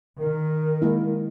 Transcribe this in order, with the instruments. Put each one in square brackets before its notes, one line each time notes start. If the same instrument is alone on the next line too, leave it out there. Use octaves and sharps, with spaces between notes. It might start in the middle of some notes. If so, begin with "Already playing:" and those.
[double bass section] D#3 [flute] A#4
[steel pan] G#3 A#3 E4